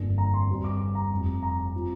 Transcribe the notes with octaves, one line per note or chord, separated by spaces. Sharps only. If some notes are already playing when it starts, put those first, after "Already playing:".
Already playing: G1 F2 D3 A#3 D4
A#5
C6
G1 G2 G3 C4
D6
A#5
F1 F2 C3
A#5
F3 C4